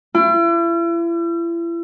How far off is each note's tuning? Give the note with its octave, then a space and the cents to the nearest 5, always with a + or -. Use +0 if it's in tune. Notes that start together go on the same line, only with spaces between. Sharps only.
E4 +40